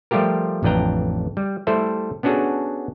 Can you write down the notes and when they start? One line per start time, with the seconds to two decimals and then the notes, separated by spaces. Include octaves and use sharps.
0.11 F3 G3 A3 F4 G4 A#4
0.63 A1 F2 D4 B4 G5 A#5
1.37 G3
1.67 G3 A3 E4 A4 C5 E5
2.23 B3 C#4 D4 F#4 G#4 A4